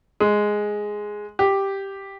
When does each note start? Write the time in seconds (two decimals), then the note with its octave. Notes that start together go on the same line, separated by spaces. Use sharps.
0.20 G#3
1.39 G4